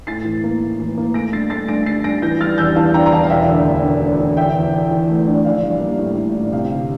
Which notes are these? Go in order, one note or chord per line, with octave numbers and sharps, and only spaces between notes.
A2 A6 C7
E3
A#3
A2
E3
A#3
A3 A#6 D7
G2 A6 C7
A3 A6 C7
G2 A#6 D7
G2 A6 C7
G2 A#6 D7
E3 G6 A#6
G3 F6 A6
E2 E6 G6
E3 F5 A5
D4 G5 A#5
A#5
E2 F5 A5
F5
E1 E5 G5
D2
E1
D2
D3
D3
E2 E5 G5
E2
E2
E3
A3
D4
A#1 F5
G3
A#3
A2
A2
A2
C3 F5
G1